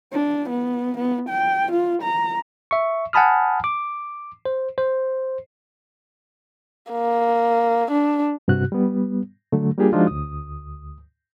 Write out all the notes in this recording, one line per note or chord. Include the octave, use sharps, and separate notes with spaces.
D4
B3
B3
G5
F4
A#5
E5 C#6
F#5 G#5 A5 B5 D#6 F6
D6
C5
C5
A#3
D4
G2 C3 F#4 F#6
G3 B3
D3 F#3 A3
G3 A#3 D4 F4 G4 G#4
F3 G#3 D4 D#4 F4 F#4
D2 D#6